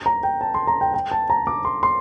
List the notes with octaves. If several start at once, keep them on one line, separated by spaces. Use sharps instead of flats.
A#5
G5
A5
C6
A#5
G5
G5
A5
A#5
D6
C6
C6